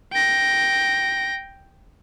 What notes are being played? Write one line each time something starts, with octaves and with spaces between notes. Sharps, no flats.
G5 A#6